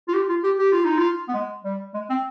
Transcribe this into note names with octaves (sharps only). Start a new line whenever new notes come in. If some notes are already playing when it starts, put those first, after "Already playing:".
F4
G4
F4
G4
G4
F4
D#4
F4
B3
G#3
G3
G#3
C4